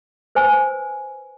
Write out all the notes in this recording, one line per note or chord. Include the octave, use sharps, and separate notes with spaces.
B4 C5 G#5 A#5